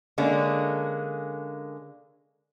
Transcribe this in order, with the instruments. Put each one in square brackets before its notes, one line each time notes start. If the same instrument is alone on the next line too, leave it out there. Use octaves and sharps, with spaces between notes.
[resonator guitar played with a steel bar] D3 G#3 A#3 C#4